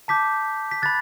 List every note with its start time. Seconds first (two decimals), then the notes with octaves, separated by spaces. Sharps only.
0.08 A5 D6 G6 B6
0.71 B6
0.82 B5 F#6 A6